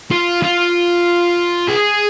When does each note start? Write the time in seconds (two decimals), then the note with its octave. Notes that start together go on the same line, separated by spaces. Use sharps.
0.11 F4
0.43 F4
1.69 G#4